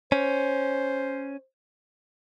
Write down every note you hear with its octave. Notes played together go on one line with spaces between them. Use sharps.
C#4 C5